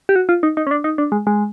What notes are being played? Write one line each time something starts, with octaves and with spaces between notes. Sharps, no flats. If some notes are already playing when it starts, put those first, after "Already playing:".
G4
F#4
F4
D#4
D#4
C#4
D4
D#4
D4
G#3
G#3